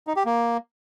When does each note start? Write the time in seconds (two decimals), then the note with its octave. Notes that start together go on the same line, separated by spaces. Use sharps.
0.07 D#4
0.16 G4
0.26 A#3